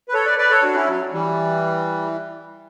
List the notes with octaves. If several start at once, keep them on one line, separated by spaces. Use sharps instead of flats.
B4
A4 C#5
B4 D5
B4 D5
A4 C#5
D4 F#4
C#4 E4
F#3
E3 G3